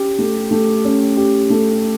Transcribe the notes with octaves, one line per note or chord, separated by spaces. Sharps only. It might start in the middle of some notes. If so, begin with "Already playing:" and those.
Already playing: C#4 G4
A3
A3
C#4
G4
A3